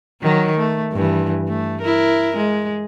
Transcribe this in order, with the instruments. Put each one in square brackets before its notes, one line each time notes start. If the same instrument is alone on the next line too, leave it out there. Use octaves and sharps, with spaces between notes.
[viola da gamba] D#3 F#3
A3
G2 E3
A3
E4 A#4
G#3